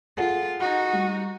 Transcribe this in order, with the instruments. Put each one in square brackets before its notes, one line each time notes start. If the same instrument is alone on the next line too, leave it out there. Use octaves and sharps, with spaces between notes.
[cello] F4 [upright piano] G#4 A4 F#5
[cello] D#4 [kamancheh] F#4
[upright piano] G3